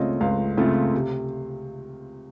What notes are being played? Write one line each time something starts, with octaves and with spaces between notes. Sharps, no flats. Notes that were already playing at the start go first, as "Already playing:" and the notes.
Already playing: C#2 C#3 A3 C4 F4 C#5 D#5
C#2 F5
C#3 A3 C4 F4
C3